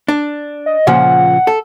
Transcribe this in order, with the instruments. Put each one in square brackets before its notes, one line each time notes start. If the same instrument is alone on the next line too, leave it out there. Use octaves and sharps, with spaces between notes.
[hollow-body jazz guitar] D4
[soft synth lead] D#5
[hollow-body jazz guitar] A#2 C#3 F3 [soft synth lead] F#5
[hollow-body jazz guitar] A4